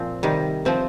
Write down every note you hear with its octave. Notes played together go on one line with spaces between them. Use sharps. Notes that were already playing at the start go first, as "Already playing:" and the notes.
Already playing: A#2 F3 C4
C3 D#3 G3
C3 F3 C4